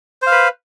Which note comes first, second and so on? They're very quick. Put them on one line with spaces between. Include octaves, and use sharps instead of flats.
C5 F5 B4